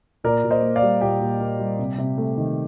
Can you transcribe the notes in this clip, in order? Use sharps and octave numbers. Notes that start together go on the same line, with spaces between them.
A#2 A#4 D5
A#2
C5 D#5
A#3
D5 F5
G3
A#2 G4
A#2
A#3
G3
C3
C3
A3
D#3